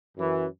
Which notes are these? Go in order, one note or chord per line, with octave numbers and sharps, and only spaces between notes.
F#2 E3